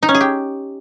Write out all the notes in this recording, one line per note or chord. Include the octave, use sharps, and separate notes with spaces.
D#4
C#4
G#4
G4